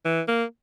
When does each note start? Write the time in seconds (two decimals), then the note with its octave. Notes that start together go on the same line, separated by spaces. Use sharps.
0.05 E3
0.27 A#3